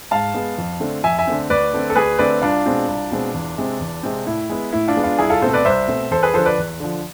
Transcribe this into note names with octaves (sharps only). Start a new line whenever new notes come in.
G#2 F5 A5
G#3 B3
F2
D3 A3 C4
F2 E5 G#5
E5 G#5
D3 A3 C4
D2 B4 D5
D3 A3 C4
A4
D2 G#4 B4
D3 A3 C4 B4 D5
C2 D4 F4
B2 G#3 C4
C2
B2 G#3 C4
E2
C3 G#3 C4
E2
C3 G#3 C4
A2 E4
G#3 B3
A2 E4
D4 F4
G#3 B3
D4 F4
C2 E4 G#4
F4 A4
B2 A3 C4 A4 C5
B4 D5
C2 C5 E5
B2 A3 C4
E2 A4 C5
G#4 B4
D3 F3 A4 C5
B4 D5
E2
D3 F3